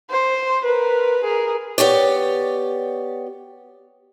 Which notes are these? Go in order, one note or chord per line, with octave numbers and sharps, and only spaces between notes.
C5
A#4 B4
G#4 A#4
B3 G4 C#5 D5